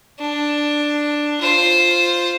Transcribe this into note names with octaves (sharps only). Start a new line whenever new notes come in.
D4
F4 C5